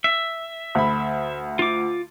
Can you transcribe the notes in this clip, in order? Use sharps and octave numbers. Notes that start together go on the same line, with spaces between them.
E5
D2 B5
F4 D6